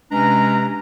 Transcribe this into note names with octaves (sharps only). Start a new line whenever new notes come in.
C3 G#3 C#4 D4 B4 A#5